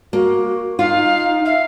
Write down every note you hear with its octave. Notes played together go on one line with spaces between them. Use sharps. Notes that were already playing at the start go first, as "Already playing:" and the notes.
A#3 F#4
D#4 F4 F5
E5 F5